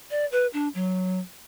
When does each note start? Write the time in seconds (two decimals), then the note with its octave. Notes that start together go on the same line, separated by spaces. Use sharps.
0.10 D5
0.32 B4
0.53 D4
0.75 F#3